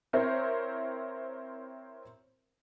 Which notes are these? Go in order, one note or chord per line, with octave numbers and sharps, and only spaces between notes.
C4 E4 A#4 C5 C#5 E5